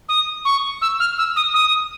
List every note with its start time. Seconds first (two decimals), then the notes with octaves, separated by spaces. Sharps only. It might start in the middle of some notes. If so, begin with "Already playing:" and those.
0.09 D#6
0.45 C#6
0.82 E6
1.00 F6
1.18 E6
1.36 D#6
1.54 D#6